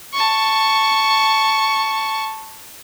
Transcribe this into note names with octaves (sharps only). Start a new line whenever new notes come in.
A5 C#6